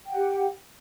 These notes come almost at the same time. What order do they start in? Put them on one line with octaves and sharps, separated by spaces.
G5 F#5 G4